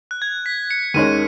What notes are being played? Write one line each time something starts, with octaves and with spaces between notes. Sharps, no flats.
F#6
G#6
B6
C#7
D#2 D#3 G#3 C#4 D#7